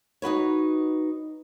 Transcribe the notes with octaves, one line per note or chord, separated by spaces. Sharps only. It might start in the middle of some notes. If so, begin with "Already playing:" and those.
D#4 F#4 B4 C#5